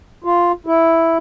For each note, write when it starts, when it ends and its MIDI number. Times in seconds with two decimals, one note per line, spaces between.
0.24 0.52 65
0.66 1.18 64